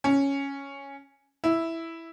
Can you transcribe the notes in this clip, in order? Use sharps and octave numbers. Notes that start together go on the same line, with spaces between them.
C#4
E4